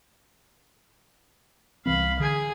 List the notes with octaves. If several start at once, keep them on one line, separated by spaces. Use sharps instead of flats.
C2 E3 C4 F5 B5
D3 G#4 G#5